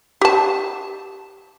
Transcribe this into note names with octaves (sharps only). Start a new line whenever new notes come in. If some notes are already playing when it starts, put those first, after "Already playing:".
G4 A5